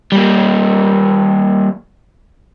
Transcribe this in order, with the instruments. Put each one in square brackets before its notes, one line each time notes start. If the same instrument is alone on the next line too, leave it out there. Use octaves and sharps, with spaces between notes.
[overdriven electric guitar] G3 A#3